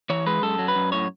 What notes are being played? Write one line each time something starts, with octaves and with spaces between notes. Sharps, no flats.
E3 C#5
G#3 B4
F#2 A4
F#3
B4
F#2
A2 C#5